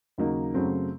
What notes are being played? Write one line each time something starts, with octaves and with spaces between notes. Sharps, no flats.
D#2 C#3 F#3 A#3 D#4
F#2 C#3 F#3 A3 C4